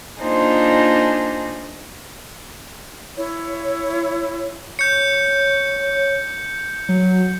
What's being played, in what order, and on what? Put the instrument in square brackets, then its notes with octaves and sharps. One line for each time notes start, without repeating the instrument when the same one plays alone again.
[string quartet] A#3 D4 D#4 F4 G#4 C5
[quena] E4 [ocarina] C#5
[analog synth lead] C#5 [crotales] G6 C#7
[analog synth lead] F#3